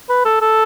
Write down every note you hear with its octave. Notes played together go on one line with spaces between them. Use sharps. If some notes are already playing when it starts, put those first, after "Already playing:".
B4
A4
A4